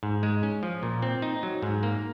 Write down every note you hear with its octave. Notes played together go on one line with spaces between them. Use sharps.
G#2
G#3
C#4
F3
A#2
C4
D#4
F#3
G#2
A#3